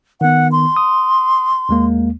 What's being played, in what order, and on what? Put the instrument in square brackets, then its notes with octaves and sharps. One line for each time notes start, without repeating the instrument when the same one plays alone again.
[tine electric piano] D#3 B3 [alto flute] F#5
[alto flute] C6
[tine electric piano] D#6
D#2 G#3 A#3